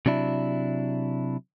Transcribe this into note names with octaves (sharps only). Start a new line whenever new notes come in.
C3 F#3 D4 E4